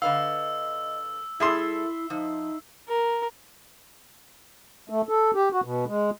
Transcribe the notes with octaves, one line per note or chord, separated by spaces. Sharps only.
D3 B4 D#5 F5 E6
G3 E4 G#4 A4 E5 C6
F3 D#4
A#4
A3
A4
G4
F#4
B2
G#3